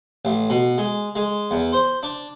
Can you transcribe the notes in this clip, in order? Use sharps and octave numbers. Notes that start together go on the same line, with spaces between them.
A1
B2
G#3
G#3
E2
C5
D4